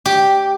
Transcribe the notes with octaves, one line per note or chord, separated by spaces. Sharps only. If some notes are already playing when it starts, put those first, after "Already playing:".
G4